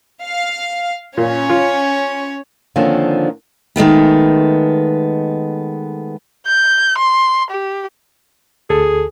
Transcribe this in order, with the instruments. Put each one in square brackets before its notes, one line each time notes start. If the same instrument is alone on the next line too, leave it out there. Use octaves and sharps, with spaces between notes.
[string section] F5
[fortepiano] A#2 [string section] C#4 C#5
[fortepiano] F4
[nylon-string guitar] D3 D#3 F3 A#3 C4 C#4
[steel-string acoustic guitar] D#3 G#3 A3 B3
[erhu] G6
C6
G4
[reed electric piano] D2 A4 [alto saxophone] G#4